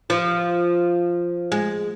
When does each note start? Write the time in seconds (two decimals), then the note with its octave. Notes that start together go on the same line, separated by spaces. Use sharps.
0.10 F3
1.52 G#3